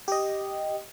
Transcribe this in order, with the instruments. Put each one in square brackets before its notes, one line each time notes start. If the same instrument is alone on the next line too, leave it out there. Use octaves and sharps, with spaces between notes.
[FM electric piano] G4 D#5